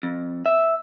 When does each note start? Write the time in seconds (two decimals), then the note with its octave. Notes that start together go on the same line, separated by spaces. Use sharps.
0.03 F2
0.46 E5